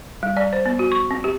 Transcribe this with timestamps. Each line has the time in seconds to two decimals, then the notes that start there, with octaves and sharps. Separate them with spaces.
0.23 G3
0.37 D5
0.53 C5
0.66 B3
0.79 F#4
0.92 C#6
1.11 C4
1.24 G4